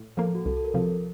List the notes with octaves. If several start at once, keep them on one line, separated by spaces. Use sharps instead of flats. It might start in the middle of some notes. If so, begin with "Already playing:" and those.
Already playing: A2
F3 A#3 A4
F#4
C2 A4
A4
A#4
C3 F3